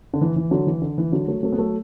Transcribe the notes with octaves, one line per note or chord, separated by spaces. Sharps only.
D3
E3
E3
D3 F#3
E3
D3
E3
D3 F#3
F#3 A3
F#3 A3
B3
F#3 A3